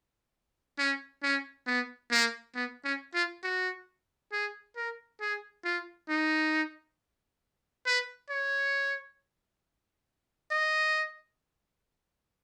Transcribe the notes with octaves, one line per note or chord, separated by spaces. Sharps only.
C#4
C#4
B3
A#3
B3
C#4
F4
F#4
G#4
A#4
G#4
F4
D#4
B4
C#5
D#5